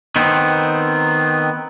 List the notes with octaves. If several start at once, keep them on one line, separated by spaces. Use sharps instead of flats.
D#3 B3 C4